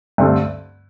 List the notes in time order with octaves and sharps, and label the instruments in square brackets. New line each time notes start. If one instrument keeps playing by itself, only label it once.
[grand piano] G2 D3 A3 C4